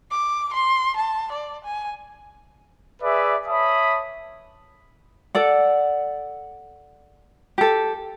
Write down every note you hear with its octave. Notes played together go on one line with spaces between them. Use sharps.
D6
C6
A5
D5
G#5
G#4 B4 D5 E5
C#5 E5 A5 B5 D#6
A4 D5 F#5
G4 A4